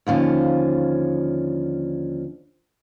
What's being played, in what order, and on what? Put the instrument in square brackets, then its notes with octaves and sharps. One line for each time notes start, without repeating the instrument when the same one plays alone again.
[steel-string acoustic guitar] D#2 D3 F3 C#4